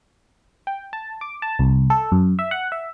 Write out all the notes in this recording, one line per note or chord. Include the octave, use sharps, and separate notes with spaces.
G5
A5
D6
A5
C2
A4
F#2
E5
F#5
E5